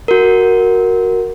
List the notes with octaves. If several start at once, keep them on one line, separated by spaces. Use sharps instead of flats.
F#4 A#4